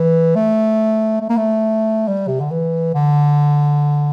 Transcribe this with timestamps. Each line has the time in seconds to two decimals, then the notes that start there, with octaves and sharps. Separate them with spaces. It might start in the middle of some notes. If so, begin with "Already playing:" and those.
Already playing: E3
0.35 A3
1.21 A3
1.30 A#3
1.37 A3
2.08 G3
2.28 C3
2.40 D3
2.51 E3
2.94 D3